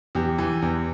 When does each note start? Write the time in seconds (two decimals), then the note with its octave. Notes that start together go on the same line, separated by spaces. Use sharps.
0.15 E2 G4
0.38 E3
0.62 E2